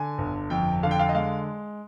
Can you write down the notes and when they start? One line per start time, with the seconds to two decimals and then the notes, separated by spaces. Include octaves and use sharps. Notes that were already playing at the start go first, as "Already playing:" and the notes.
Already playing: D3 G#5
0.18 G1
0.50 F2 G5
0.83 D3 F5
0.91 G5
0.99 F5
1.09 D#5
1.14 G#3 F5